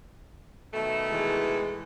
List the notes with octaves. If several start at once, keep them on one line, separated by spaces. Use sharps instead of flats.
B2 D#3 A3
E3 G#3